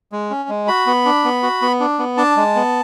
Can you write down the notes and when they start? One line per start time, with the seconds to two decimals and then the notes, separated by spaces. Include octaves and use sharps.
0.12 G#3
0.30 C#4
0.49 G#3
0.68 F#4 B5
0.86 B3
1.05 D4
1.24 B3
1.43 F#4
1.62 B3
1.80 D4
1.99 B3
2.17 D4 A5
2.37 G#3
2.55 B3